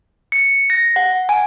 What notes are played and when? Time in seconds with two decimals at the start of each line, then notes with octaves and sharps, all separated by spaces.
0.32 C#7
0.70 A#6
0.96 F#5
1.29 G#5